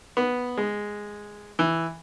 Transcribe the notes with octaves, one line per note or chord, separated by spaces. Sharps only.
B3
G#3
E3